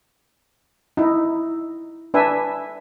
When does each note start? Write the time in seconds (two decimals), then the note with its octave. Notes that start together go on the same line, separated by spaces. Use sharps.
0.97 D#4 E4
2.14 D4 B4 E5 G#5